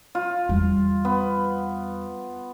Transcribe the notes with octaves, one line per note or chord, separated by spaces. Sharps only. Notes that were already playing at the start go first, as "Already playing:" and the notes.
F4
E2 G3
B3